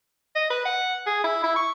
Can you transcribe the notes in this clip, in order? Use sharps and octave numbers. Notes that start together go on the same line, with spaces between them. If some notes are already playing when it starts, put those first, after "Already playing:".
D#5
B4
F#5
G#4
E4
E4
C#6